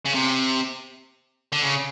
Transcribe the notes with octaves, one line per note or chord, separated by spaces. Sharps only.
C#3
C3
D3
C#3